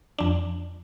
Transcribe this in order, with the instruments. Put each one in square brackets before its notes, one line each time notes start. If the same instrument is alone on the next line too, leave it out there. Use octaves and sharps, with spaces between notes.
[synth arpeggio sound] F2 D4